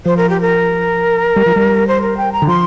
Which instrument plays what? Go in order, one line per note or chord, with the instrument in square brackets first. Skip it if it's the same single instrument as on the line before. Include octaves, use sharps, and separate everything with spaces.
[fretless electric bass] F3 [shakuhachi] C5
[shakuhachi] A#4
G4
A#4
[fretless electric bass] G3
F3
G3
[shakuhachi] C5
A#4
G5
A#5
[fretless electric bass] D3
[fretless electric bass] F3 [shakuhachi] C6